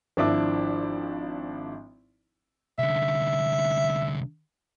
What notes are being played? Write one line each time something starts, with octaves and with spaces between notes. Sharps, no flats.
G#1 F3 D4 E4 E5 D6
C2 D3 E5